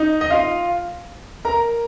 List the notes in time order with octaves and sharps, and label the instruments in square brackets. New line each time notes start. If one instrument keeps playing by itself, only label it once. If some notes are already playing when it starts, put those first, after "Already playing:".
Already playing: [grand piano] D#4
D#5
F4 F5
A#4 A#5